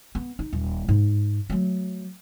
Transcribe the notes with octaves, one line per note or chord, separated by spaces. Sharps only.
B3
D#4
D#1
G#2
F#3 A3